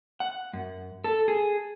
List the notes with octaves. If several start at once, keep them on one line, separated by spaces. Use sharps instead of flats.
F#5
F#2
A4
G#4